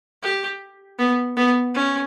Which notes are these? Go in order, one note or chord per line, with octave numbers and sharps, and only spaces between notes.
G4
B3
B3
C#4